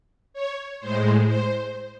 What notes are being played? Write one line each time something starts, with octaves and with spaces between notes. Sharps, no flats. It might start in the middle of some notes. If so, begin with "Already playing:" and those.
C#5
A2 G#3 C5
C5